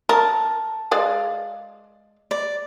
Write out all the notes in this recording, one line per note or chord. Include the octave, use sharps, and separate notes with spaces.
A#4 A5
G#3 D5 F5
D5